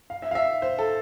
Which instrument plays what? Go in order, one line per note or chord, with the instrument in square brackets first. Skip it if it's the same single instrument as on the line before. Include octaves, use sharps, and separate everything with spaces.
[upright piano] F5
E5
F5
E5
C5
A4